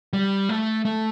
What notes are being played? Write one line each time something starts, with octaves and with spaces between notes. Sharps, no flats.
G3
A3
A3